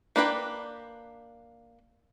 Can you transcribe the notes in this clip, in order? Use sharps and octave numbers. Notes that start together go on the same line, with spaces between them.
A#3 D4 B4 C5 G5